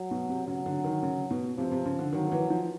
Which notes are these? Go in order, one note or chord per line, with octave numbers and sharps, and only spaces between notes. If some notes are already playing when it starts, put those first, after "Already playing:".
Already playing: F#3
B2
C3
C#3 F#3
D3
D#3
C#3
B2
C3 F3
C3
C#3
D3
D#3 F#3
D#3
E3
F3